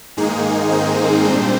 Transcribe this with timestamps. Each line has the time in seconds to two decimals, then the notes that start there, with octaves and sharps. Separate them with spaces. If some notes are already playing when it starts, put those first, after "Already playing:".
0.17 G#2 D#3 G#3 A#3 D#4 G#4
0.71 C4 C5
1.24 A#2 G3 C4 D4 C5